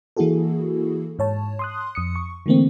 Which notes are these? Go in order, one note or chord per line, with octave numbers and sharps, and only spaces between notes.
E3 A#3 E4 F#4 G#4 A4
G#2 C#5 A5
C6 D#6 F#6
F2 D#6 C#7
C#6
D3 E3 A3 A#3 C4